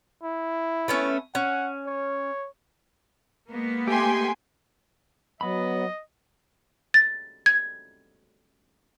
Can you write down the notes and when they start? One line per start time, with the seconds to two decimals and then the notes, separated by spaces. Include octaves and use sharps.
0.23 E4
0.88 A3 B3 C#4
1.35 C#4 F#5
1.87 C#5
3.50 G#3 A#3 B3
3.87 A3 G4 G5 G#5 C6
5.41 F#3 B3 D#5 B5
6.94 A6
7.46 G#6